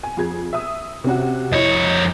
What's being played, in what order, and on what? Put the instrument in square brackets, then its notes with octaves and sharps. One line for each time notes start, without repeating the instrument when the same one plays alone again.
[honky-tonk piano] G#5
F2 G#4 G#6
E5 D#6
C3 C#4 F#4
[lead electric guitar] F2 C#5 [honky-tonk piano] E4 D#5